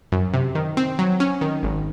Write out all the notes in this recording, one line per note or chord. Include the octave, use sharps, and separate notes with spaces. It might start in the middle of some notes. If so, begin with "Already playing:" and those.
F#2
C3
D#3
C4
F#3
C#4
D#3
G#1